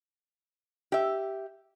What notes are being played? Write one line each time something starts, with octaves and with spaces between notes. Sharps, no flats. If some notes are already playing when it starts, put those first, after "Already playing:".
G4 E5